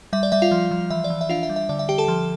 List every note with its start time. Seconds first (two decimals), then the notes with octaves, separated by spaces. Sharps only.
0.13 G3 E5
0.23 D5
0.32 G3 E5
0.42 F4 F5
0.51 F3
0.71 F3
0.90 E3 E5
1.04 D5
1.10 E3
1.21 E5
1.29 D4 F4 F5
1.43 E5
1.49 G3
1.56 E5
1.69 D3 D5
1.79 E5
1.89 D3 G4 G5
1.98 A4 A5
2.08 F3